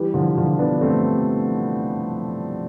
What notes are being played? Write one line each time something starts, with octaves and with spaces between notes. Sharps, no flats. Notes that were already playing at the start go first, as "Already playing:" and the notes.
Already playing: E3 G3
D3 F3
D3 F3
B3 D4
A3 C4